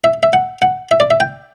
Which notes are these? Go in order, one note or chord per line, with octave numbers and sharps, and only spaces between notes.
E5
E5
F#5
F#5
E5
D5
E5
G5